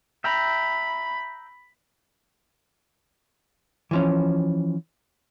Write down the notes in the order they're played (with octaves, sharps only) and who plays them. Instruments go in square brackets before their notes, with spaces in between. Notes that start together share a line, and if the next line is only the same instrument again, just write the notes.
[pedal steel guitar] E5 G5 A#5 [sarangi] B5
[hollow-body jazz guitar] E3 F3 C#4